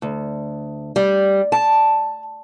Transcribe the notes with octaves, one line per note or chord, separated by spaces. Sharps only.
D2
G3
A5